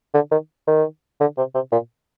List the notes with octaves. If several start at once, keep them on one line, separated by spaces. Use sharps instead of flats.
D3
D#3
D#3
D3
C3
C3
A#2